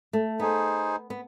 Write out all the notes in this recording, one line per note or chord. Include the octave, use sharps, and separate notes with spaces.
A3
B3 D#4 G#4 C5
B3